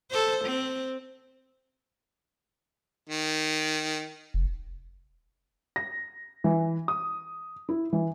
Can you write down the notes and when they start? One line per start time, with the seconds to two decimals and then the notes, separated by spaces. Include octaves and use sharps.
0.11 A4 C5
0.44 C4
3.10 D#3
4.34 F1
5.76 A#6
6.44 E3
6.88 D#6
7.69 E4
7.93 E3